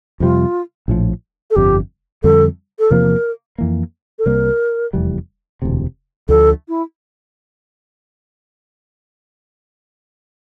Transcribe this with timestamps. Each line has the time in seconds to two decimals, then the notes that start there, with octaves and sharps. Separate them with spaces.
0.20 F2 C3 G3 F4
0.88 A#1 A2 F3
1.50 A4
1.56 G1 F2 C3 G4
2.23 F2 D3 G3 C4 A4
2.79 A4
2.90 E2 C3 F3 A#3 A#4
3.58 F2 E3 A#3
4.19 A4
4.26 C2 C3 G3 A#3 A#4
4.93 F1 E2 E3 G3
5.62 E1 D2 C3
6.29 D2 D3 F3 A4
6.69 E4